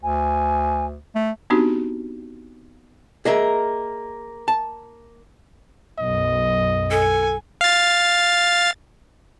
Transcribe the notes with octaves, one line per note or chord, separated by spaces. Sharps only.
D2 G#5
A3
B3 C4 D4 D#4 F#4 G4
A#3 G#4 A#4 D#5 E5
A5
B1 F#2 D#5
A4 G#5
F5 A6